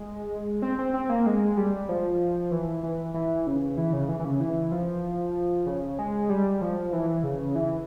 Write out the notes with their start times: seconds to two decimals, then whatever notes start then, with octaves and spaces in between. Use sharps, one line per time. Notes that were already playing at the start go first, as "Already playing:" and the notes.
Already playing: G#3
0.62 C4
0.79 C4
0.94 C4
1.10 A#3
1.26 G#3
1.57 G3
1.89 F3
2.51 E3
2.83 E3
3.14 E3
3.47 C#3
3.77 E3
3.93 C#3
4.09 E3
4.20 E3
4.25 C#3
4.40 E3
4.72 F3
5.66 C#3
5.99 G#3
6.30 G3
6.62 F3
6.93 E3
7.23 C#3
7.55 E3